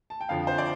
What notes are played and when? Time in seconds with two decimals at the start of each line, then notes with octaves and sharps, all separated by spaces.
0.10 A5
0.21 G5
0.29 F2 D3 F3 F5
0.47 C5
0.58 D5